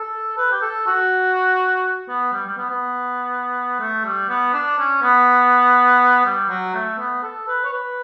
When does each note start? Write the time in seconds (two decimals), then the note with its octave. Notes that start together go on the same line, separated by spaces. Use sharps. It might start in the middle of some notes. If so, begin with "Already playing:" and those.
Already playing: A4
0.37 B4
0.52 G4
0.61 A4
0.87 F#4
2.09 B3
2.33 G3
2.46 G3
2.58 B3
2.70 B3
3.80 A3
4.05 G3
4.29 B3
4.53 D4
4.79 C#4
5.02 B3
6.25 G3
6.49 F#3
6.74 A3
6.98 B3
7.23 A4
7.47 B4
7.64 C#5
7.73 B4